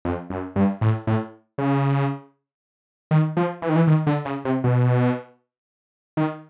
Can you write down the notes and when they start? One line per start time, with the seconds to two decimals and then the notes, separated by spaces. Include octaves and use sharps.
0.05 F2
0.30 F#2
0.56 G2
0.81 A2
1.07 A2
1.58 C#3
3.11 D#3
3.37 F3
3.62 E3
3.69 D#3
3.76 E3
3.87 D#3
4.07 D3
4.25 C#3
4.45 C3
4.64 B2
6.17 D#3